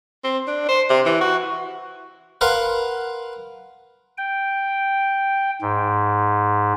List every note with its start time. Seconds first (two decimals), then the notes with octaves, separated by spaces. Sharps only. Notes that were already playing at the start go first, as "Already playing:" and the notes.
0.24 C4
0.47 D4
0.68 C5
0.90 C3
1.06 E3
1.21 F#4
2.41 A#4 B4 F5 F#5 C6
4.18 G5
5.62 G#2